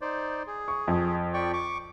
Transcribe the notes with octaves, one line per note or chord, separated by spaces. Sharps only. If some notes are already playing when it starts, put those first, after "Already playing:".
D#4 C5 D5
G#4
C#6
F2
D5 G5 C#6
C#6 D6